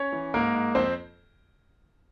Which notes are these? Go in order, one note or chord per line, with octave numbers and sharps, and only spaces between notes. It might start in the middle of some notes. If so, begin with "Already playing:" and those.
Already playing: C#4 C#5
E3
G#2 A#3 A#4
G#2
F2 C4 C5